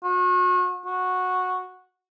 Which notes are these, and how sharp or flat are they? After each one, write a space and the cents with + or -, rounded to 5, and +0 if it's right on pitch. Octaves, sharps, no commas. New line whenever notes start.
F#4 -35
F#4 -10